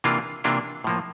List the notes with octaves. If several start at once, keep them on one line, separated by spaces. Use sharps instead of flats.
C3 E3 A#3 D4 F4
C3 E3 A#3 D4 F4
A2 F3 A#3